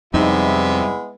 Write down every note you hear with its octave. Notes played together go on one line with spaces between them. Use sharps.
F2 C3 G3 G#3 B3 D#4 E4